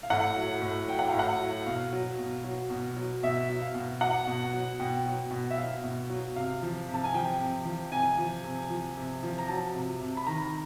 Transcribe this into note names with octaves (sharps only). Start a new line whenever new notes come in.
F5
A2 F#5
F#3
A2
F#3 G5
F#5
A2 F5
F#5
F#3
B2 F5
F#3
B2
F#3
B2
F#3
B2 E5
F#3
F5
B2
F#3 F#5
B2
F#3
B2 G5
F#3
B2
E5
F#3 F5
B2
F#3
C3 F5
F3
C3
A5
G#5
F3 G5
C3
F3
C3 G#5
F3
C3
F3
C3
F3
A#5
F#3 A5
C3
C3
B5
D#3 A#5